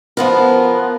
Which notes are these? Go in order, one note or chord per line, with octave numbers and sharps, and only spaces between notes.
F3 B3 A#4